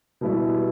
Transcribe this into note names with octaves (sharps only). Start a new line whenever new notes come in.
B2 G3 B3 E4